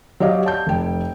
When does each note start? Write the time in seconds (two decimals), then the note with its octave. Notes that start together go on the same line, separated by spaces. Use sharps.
0.20 F#3 G4 D5 D#5 F5
0.46 A5 G6
0.67 F1 G5